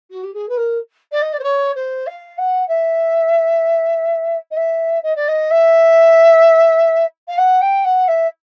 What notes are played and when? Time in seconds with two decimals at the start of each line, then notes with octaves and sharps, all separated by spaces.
0.10 F#4
0.23 G4
0.33 G#4
0.48 B4
0.56 A#4
1.11 D5
1.22 D#5
1.32 D5
1.39 C5
1.43 C#5
1.75 C5
2.06 F5
2.37 F#5
2.67 E5
4.50 D#5
4.56 E5
5.02 D#5
5.15 D5
5.28 D#5
5.50 E5
7.27 F5
7.37 F#5
7.61 G5
7.84 F#5
8.07 E5